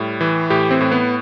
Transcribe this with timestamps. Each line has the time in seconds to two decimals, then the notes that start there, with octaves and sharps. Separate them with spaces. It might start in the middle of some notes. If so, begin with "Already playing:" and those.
Already playing: A2 G3
0.21 E3
0.50 A2 G4
0.71 C4
0.81 A2
0.91 B3